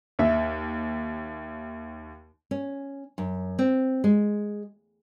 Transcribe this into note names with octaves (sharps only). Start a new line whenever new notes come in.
D#2 E5
C#4
F#2
C4
G#3